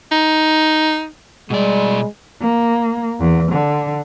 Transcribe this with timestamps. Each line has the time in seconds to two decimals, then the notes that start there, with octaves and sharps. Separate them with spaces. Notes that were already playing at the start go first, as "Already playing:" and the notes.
0.12 D#4
1.50 B2 G3 G#3 D5
2.40 A#3
3.20 E2
3.50 D3